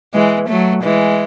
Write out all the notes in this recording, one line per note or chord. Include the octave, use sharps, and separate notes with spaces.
E3 G#3
F#3 A3
E3 G#3